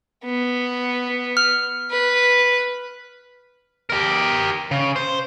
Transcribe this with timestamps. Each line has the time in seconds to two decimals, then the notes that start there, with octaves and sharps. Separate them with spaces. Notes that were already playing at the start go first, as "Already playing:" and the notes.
0.26 B3
1.37 F6
1.91 B4
3.90 G4 A#4
4.71 C#3
4.96 C5